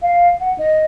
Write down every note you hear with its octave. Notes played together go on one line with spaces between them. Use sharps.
F5
F#5
D#5